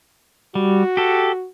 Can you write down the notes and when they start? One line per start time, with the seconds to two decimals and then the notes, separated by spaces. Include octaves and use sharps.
0.55 G3 F#4
0.97 G4 A4